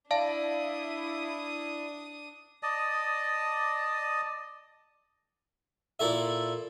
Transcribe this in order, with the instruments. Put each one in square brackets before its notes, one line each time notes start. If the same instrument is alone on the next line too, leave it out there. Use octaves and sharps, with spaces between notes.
[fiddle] D4 D#6 [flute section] E4 [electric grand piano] D5 [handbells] F5 A5
[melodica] D5 D#5 A5 D#6
[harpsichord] A#2 E4 A4 E5